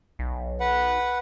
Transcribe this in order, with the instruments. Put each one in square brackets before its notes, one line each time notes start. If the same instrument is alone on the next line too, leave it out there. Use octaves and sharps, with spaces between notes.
[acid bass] B1
[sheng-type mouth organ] B4 F#5